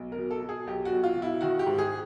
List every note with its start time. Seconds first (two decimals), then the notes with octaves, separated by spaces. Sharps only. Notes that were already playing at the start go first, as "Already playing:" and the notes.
Already playing: B1
0.12 A#4
0.17 B2
0.31 A4
0.42 B2
0.49 G#4
0.67 B1 G4
0.85 F#4
0.92 B1
1.03 F4
1.16 B2
1.22 E4
1.41 D#3 F#4
1.59 G4
1.66 G#2
1.78 G#4